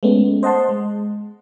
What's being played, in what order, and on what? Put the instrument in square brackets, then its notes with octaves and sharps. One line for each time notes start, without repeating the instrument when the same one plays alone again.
[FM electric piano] G#3 A3 B3 C#4
C5 D#5 F#5 A5 C6
G#3